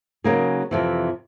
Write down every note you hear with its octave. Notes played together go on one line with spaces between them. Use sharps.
C#3 F#3 A#3 D#4 G#4
F2 C3 E3